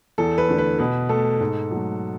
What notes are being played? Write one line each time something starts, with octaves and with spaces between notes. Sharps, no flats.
E2 A4
B4
D3 A3
B4
B2 B4
A3 A4
G#2
F#3 A3